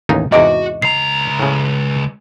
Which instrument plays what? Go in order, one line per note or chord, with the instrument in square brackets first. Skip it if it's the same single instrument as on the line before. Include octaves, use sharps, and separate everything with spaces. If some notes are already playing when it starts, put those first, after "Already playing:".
[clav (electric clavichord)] A1 D#2 D#4
[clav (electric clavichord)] E2 G#2 C3 [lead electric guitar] F#4 [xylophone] D#5 D6 D7
[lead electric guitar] C#2 A#5 [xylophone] C7
[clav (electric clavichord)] A2 C#3